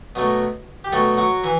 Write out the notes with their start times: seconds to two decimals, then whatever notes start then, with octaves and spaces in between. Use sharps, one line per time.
0.15 B2 F#3 A3
0.84 G4
0.92 B2 F#3 A3 A4
1.18 F#3 F#4
1.43 E3 E4